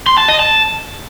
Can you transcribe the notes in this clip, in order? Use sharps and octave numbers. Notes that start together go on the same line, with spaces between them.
C6
A5
D#5
A5